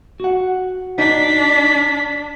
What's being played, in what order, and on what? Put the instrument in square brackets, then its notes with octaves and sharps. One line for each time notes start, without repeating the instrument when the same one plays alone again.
[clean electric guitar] F#4 F#5
[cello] D4 [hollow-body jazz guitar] D#4 [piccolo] B6